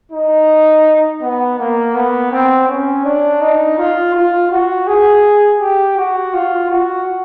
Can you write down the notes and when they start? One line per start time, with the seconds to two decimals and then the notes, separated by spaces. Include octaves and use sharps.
0.12 D#4
1.22 B3
1.59 A#3
1.95 B3
2.32 C4
2.68 C#4
3.05 D4
3.41 D#4
3.78 F4
4.14 F4
4.51 F#4
4.88 G#4
5.60 G4
5.97 F#4
6.34 F4
6.70 F#4